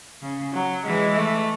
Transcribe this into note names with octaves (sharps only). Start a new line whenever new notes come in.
C#3
F#3
E3 G#3
A3